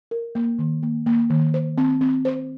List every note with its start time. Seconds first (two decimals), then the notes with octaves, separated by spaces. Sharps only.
0.11 A#4
0.35 A#3
0.59 D#3
0.83 A#3
1.06 A#3
1.30 D#3
1.54 C5
1.78 C4
2.01 C4
2.25 C5